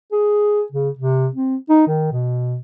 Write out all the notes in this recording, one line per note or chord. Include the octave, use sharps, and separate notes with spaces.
G#4
C#3
C3
C4
D#4
D#3
B2